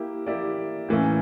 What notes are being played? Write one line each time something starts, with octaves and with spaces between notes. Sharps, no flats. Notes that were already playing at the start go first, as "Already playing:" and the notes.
Already playing: A#3 E4 G4
A#3 E4 G4 D5
A2 E3 A#3 C#4 E4